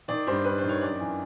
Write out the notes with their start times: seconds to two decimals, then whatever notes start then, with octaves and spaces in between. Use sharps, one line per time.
0.08 D#3 D5
0.27 G2 C5
0.45 G2 B4
0.58 C5
0.63 D#3
0.69 C#5
0.81 F#2 D5
1.00 E3